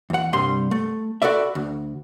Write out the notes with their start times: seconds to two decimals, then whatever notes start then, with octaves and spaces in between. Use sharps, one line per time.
0.10 E2 F#5
0.33 C2 G2 G3 C6
0.71 A3
1.22 F#4 A4 B4 D5 E5
1.55 D2